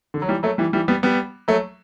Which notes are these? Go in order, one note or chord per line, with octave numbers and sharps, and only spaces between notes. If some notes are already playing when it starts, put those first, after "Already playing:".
D3
F#3
E3 G3
F#3 A3
E3 G3
E3 G3
G3 B3
G3 B3
F#3 A3